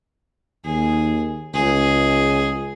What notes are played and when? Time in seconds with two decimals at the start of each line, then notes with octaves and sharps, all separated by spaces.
0.64 D#2 G#4
1.54 C#2 G#4